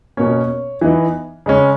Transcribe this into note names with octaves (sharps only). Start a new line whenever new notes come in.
B2 A#3 C#4 C#5
E3 B3 D#4
C#3 G#3 C#4